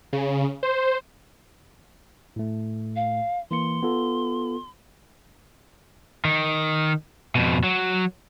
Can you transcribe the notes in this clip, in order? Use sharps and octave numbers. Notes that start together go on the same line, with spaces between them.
C#3
C5
A2 A3
F5
E3 A#3 C6 C#7
B3 F4 A4
D#3
F2 B2
F#3